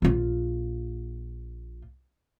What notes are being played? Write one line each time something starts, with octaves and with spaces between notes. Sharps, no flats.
A#1 F4